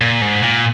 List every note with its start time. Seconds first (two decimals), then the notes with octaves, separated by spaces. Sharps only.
0.01 A#2
0.21 G#2
0.42 A#2